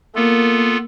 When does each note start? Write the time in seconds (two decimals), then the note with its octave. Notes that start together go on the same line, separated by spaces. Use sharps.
0.15 A#3 B3 F4 A4